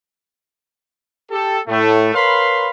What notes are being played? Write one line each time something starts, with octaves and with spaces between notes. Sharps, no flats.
G4 A4
A2 A3
A#4 B4 C#5 F5 B5 C6